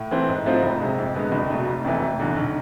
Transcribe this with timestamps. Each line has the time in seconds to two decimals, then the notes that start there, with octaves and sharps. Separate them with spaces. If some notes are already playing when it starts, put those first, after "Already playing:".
Already playing: A2
0.11 E3 A3 C4
0.28 G#2
0.46 F3 A3 C4 F4
0.63 C2
0.80 C3 G#3
0.98 F2
1.15 D3 G#3 B3
1.32 C2
1.50 B2 A3
1.67 F1
1.84 F2 C3 E3 A3
2.02 F1
2.20 E2 D3
2.36 B1